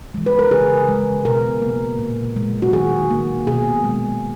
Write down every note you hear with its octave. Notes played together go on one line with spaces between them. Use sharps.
E3 G#3
B4
A#4
C#3 G#4
G#3
B2 A#4
A#3
A#2
G#3
F#4
D#3 G#4
A#3
B2 G#4
G#3